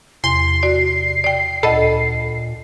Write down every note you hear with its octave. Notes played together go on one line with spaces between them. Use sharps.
E2 C3 C6 C7
F#4 D5
D5 G5
D2 A#2 A4 D#5 B5